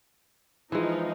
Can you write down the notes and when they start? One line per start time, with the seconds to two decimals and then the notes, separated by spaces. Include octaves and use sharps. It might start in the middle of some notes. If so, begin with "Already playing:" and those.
0.72 E3 F3 G#3 D#4